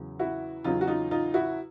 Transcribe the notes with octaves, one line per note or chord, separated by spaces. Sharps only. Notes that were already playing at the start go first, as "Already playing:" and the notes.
Already playing: E2 C#3 F#3
E4 F#4
E2 C#3 F#3 D#4 F4
F#4
D#4 F4
D#4 F4
E4 F#4